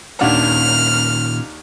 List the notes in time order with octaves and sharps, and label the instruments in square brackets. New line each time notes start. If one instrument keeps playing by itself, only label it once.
[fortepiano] D#2 D4 F#5 [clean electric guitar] A#2 D#3 C#4 [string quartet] F6